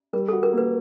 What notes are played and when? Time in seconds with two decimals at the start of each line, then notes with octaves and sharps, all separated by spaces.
0.13 G3 A#4
0.29 F#4 A4
0.43 A#4
0.53 A#3 B4